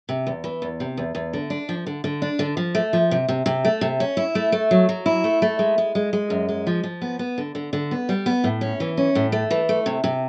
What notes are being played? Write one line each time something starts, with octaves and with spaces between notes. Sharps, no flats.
C3
E2
E3
E2
C3
E2
E2
D3
D4
F3
D3
D3
D4
D3
F3
A3
F3
C3
C3
C3
A3
C3
C#4
E4
A3
A3
F#3
F#3
E4
A3
A3
G#3
G#3
G#3
G#3
F#2
G#3
F3
F3
B3
B3
D3
D3
D3
B3
G3
B3
A2
C#4
E3
C#4
A2
A3
E3
A3
C3
C3